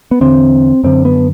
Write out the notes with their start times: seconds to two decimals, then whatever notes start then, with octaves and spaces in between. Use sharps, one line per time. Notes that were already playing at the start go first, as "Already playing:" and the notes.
0.11 B3
0.21 E2 D3 C4
0.84 F#2 D3 C4
1.05 B3